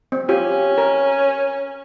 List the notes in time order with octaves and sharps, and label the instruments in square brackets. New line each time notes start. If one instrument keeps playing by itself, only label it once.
[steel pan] C4
[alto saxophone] C#4 [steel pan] F4 G4
[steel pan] A#4